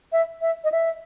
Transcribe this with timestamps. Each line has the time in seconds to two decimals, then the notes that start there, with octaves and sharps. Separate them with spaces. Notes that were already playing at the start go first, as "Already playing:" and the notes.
0.12 E5
0.42 E5
0.64 D#5
0.72 E5